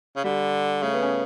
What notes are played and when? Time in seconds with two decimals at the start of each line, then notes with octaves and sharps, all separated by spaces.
0.16 C#3
0.24 D3 G3
0.83 C#3 A3
0.93 B3
1.02 C#4